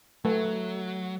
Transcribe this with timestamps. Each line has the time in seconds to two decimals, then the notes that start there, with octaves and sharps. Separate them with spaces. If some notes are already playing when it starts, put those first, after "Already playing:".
0.25 F#3 A3 B4